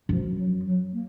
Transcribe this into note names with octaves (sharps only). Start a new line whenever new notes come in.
F#2 F3
F#3
F#3
A#3